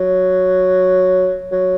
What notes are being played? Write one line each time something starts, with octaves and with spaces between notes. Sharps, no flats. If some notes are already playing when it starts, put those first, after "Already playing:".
Already playing: F#3
F#3